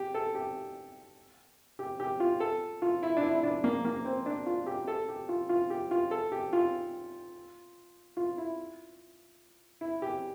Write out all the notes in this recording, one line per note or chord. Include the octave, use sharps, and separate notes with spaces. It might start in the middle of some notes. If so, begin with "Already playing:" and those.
Already playing: G4
A4
G4
G4
G4
F4
A4
F4
E4
D4
E4
E4
D4
A#3
A#3
C4
D4
F4
G4
A4
G4
F4
F4
G4
F4
A4
G4
F4
F4
E4
E4
G4